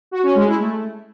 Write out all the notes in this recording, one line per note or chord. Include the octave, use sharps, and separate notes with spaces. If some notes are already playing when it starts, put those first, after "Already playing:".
F#4
C#4
G#3
E4
A3